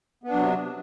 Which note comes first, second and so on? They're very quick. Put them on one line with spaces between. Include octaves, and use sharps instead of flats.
B3 D4 F#3 C3